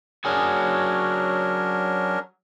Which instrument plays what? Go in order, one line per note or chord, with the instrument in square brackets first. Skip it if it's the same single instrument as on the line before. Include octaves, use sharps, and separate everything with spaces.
[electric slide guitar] F#3 G#4 G#5 [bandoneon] C#4 D4 A#4